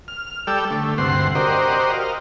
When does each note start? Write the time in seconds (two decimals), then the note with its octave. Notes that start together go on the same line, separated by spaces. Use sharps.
0.08 F6
0.47 G3 A4 D5 G5 E6
0.70 D3 A3
0.98 D2 G2 C3 F#5 C6
1.35 F#4 G4 A#4 C5 D5 D#5
1.94 D#5 F5